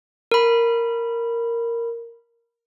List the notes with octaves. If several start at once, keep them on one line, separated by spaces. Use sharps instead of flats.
A#4 B5